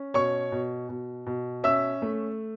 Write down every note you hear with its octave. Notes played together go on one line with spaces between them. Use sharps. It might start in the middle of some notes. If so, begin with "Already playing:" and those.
Already playing: C#4
B2 C#5 C#6
B2
B2
B2
C#4 E5 E6
A3